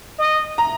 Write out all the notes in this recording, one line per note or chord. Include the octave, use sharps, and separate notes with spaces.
D#5
A#5